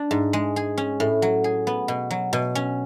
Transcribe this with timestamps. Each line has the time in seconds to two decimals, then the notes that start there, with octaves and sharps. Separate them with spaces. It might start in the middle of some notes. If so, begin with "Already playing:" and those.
Already playing: D4
0.11 G#2
0.33 G#3
0.56 G#4
0.78 C#4
1.00 A2
1.22 F#3
1.44 G#4
1.67 B3
1.88 B2
2.11 F#3
2.33 B2
2.55 C#4